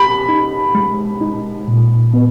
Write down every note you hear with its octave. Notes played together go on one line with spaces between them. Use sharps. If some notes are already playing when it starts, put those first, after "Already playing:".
Already playing: G4 B5
D#4
G#3
D#4
A#2
B3